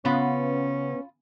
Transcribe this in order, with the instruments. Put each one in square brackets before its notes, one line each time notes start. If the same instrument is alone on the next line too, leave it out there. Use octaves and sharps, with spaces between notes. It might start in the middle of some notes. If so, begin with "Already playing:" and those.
[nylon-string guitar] C#3 [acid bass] B3 [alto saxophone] C#4 [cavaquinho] F4 B5 D#6